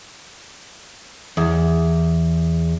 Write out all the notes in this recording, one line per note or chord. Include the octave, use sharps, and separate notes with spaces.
E2